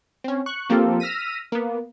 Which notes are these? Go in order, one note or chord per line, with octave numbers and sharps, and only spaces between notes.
C4 C#4
C#6 F#6
F3 A#3 C4 F4 G4 A4
E6 F6 A#6 B6 D#7
A#3 B3